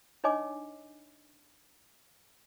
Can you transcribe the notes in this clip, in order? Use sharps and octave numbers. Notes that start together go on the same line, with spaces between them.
D4 D#4 C#5 D#5 G#5 D6